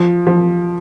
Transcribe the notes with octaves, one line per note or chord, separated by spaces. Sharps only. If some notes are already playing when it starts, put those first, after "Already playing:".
Already playing: F3
F3